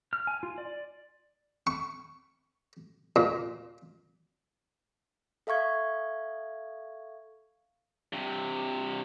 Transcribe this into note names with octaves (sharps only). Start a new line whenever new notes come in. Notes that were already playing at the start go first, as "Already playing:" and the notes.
F6
G#5
F4
D5
C#6
A#2
A4 E5 F5 C#6 G#6
G2 C3